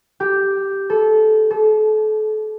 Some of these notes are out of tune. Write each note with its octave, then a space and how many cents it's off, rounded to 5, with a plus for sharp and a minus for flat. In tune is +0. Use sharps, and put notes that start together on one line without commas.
G4 +0
A4 -20
A4 -35